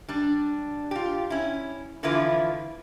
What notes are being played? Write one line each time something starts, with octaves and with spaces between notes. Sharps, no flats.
G3 D4
F4 G4
C#4 E4
D3 E3 F3 E4 F4 B4